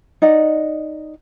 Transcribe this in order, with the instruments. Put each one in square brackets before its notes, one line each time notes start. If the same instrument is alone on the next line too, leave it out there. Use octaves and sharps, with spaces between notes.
[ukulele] D#4 D5 D#5 F#5